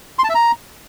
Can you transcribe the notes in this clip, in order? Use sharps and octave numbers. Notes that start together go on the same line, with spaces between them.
C6
A5
E5
A#5